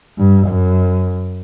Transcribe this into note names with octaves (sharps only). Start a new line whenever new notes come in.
G2
F#2